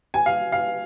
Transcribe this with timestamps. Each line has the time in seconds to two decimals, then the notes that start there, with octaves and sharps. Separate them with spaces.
0.14 G#5
0.26 F5
0.52 F5